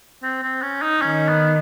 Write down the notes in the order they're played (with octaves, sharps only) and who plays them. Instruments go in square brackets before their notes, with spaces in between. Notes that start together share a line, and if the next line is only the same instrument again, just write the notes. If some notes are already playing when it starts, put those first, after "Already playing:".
[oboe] C4
C4
C#4
D#4
[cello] D#3 [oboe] C#4
[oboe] B3